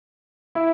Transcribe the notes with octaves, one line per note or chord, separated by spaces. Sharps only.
E4